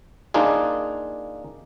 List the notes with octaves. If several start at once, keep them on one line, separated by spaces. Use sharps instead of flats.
A#3 D4 D#4 F4 G#4